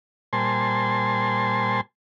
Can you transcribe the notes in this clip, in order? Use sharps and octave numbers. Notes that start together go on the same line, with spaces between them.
A#2 G3 C5 G#5 A5 C6